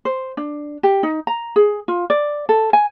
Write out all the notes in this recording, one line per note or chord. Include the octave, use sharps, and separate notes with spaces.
C5
D4
G4
D#4
A#5
G#4
F4
D5
A4
G#5